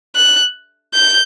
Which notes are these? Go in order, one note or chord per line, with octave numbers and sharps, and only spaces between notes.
F#6
G6